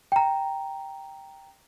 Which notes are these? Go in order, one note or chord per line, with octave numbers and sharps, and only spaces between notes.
G5 A#5